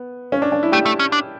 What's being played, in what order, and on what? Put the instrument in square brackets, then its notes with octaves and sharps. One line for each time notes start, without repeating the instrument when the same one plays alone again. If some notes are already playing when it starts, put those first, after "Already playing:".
Already playing: [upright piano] B3
C#4
D4
D4
E4
[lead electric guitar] A3 [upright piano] G4
[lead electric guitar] A3
C#4
D4